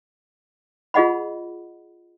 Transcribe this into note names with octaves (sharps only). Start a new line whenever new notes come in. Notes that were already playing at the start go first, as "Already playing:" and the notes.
F4 G#4 D#5 F#5 B5